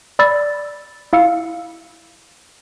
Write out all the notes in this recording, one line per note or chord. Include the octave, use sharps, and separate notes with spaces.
D5 B5 E6 A6
E4 F5 E6 C#7